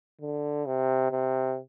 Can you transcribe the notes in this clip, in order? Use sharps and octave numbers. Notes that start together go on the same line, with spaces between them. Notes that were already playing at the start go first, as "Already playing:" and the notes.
D3
C3
C3